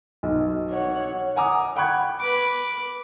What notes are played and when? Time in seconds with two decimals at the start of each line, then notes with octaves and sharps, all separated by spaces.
0.23 B1
0.70 C#5 F#5
1.36 F#5 G#5 A#5 D6 D#6
1.76 F#5 G5 B5 C#6 F#6 G#6
2.20 B4 D6